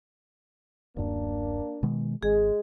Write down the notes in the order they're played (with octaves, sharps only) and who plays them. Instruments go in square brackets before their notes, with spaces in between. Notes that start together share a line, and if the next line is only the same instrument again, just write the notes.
[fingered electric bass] D1 F#2 [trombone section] A#3 D4
[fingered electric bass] B2 D#3 G#3
[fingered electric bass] G#1 [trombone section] G#3 [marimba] G#4